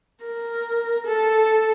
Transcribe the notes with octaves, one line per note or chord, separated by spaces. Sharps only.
A#4
A4